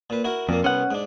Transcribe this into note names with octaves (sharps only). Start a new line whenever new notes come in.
A#2 B4
E4 F#4 A#4
F2 A#2 A#3
C2 B3 C#4 F#5
G#2 D4